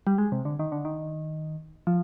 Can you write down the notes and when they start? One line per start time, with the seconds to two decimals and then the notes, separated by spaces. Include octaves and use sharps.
0.07 G3
0.18 G#3
0.32 C3
0.45 D3
0.59 D#3
0.72 D3
0.85 D#3
1.87 F3